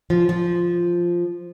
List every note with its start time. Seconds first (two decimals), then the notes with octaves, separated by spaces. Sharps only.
0.10 F3
0.29 F3